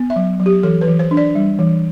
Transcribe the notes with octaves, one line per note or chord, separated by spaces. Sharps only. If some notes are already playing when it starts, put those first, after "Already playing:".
Already playing: B3
E5
F#3
F#3
G4
E3 A4
B4
E3
C5
D4
D5
G3
E3